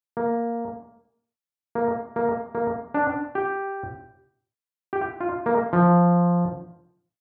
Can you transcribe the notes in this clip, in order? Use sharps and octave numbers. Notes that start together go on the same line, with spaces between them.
A#3
A#3
A#3
A#3
D4
G4
G4
F4
A#3
F3